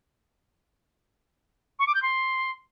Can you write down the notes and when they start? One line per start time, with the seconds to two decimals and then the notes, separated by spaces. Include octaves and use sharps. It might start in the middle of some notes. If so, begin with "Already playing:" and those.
1.79 C#6
1.87 D6
1.95 G6
2.02 C6